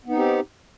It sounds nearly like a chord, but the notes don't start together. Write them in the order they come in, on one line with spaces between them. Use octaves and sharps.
B3 D#4 C4 G4